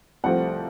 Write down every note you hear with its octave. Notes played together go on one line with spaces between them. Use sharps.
C2 C3 F3 A3 C4 F#5